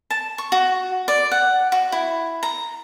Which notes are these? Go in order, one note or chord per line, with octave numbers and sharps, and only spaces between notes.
A5
C#6
F#4
D5
F#5
F#4
E4
A#5